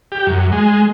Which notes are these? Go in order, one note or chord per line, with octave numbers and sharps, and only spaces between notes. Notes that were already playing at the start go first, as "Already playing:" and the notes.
G4
F#2
G#3